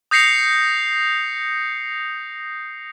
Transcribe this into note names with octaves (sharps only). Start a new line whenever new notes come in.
D#6 G6 A#6 C7 C#7 F7